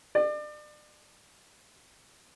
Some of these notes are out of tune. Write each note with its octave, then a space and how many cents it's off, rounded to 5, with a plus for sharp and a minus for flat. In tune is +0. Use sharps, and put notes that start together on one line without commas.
D5 +35